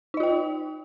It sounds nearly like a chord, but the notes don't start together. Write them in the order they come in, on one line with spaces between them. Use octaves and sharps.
D#4 D#5 F4 G5